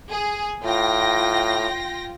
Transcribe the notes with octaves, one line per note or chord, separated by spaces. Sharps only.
G#4
A2 F4 G5 A#6